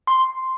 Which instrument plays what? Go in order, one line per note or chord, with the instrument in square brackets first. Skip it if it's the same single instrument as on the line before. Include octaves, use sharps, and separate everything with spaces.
[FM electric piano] C6